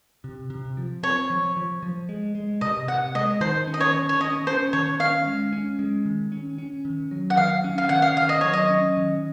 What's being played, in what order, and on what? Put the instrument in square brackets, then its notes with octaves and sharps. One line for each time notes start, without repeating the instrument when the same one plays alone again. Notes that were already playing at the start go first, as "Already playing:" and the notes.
[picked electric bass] C3
C3
F3
[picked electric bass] C4 [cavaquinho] C#5
[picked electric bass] F3
F3
F3
G#3
G#3
[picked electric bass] C3 [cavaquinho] D#5
[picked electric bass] C3 [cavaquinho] F#5
[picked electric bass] G#3 [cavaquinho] D#5
[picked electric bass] D#3 [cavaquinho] C5
[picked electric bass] C#4
[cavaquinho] D#5
C#5
[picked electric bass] D#3
[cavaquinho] C#5
[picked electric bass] C#4 [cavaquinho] D#5
[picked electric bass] C#4 [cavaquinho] C5
[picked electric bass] D#3 [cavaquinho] C#5
[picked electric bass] C#4 [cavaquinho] F5
[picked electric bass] G#3
C#4
G#3
D#3
C#4
C#4
D#3
F#3
[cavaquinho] F#5
[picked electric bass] D#3 [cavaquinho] F5
[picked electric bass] C#4
[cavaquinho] F5
[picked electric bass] D#3 [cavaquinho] F#5
[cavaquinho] F5
[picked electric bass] D#3 [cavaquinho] F5
[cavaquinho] D#5
[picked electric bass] F#3 [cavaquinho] C#5
[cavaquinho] D#5
[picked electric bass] C#4
D#3